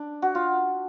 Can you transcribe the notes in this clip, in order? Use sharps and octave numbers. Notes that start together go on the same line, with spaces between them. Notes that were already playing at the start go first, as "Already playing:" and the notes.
Already playing: D4
F#4
F4